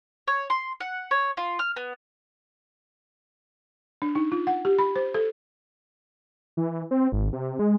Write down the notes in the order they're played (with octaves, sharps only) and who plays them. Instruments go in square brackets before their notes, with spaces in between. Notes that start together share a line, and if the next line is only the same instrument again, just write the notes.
[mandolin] C#5
C6
F#5
C#5
F4
F6
B3
[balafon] D4
D#4
F4
F#5
G4
B5
C5
A4
[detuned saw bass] E3
C4
G#1
C3
G#3